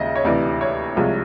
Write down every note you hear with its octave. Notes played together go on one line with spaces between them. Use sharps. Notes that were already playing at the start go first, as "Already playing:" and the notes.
Already playing: D#2 C#3 F3 G#3 D#5 E5
C#5
D2 C3 E3 D5
C#5
C2 C3 F3 G#3